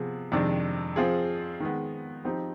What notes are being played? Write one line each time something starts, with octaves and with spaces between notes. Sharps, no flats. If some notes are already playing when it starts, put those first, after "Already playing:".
Already playing: C3 F3 B3 G#4
F2 C3 D#3 G#3 D4
F3 C4 F4 G#4
D#3 G#3 B3
F3 C4 D#4 G4